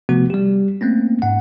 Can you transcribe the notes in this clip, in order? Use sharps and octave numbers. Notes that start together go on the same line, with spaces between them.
C3 F3 A3 B3 F#4
G3 G4
A3 A#3 C4 C#4
G#2 F#5